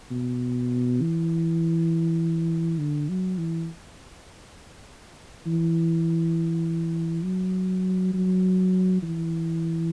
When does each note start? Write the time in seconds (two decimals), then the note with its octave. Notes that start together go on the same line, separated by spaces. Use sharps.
0.11 B2
1.01 E3
2.79 D3
3.09 F#3
3.38 E3
5.47 E3
7.24 F#3
8.14 F#3
9.03 E3